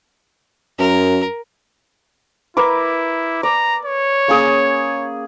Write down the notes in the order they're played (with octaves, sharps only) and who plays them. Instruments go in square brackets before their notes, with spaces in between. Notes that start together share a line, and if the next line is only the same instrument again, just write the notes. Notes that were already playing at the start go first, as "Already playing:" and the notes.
[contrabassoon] F#2 [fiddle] A#4
[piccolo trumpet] E4 [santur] A#4 B4 D6
[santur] D5 [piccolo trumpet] A#5
[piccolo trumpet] C#5
[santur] A#3 C#4 G#4